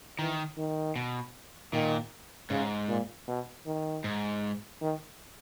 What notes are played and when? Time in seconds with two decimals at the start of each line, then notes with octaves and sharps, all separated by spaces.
0.19 D#3 E3
0.58 D#3
0.96 B2
1.73 A#2 D#3
2.50 G#2 C#3
2.89 A#2
3.28 B2
3.66 D#3
4.04 G#2
4.82 D#3